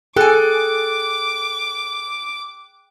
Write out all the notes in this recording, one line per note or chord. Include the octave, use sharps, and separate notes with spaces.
G#4 A4 G5 G#5 D6 F#6